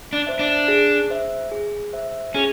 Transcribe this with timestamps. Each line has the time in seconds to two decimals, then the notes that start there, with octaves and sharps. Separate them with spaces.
0.13 D4
0.27 C5 E5
0.39 D4
0.68 G#4
1.10 C5 E5
1.51 G#4
1.93 C5 E5
2.34 C#4 G#4